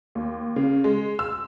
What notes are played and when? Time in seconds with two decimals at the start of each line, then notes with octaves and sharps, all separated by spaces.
0.15 D#2
0.56 C#3
0.84 G#3
1.19 E6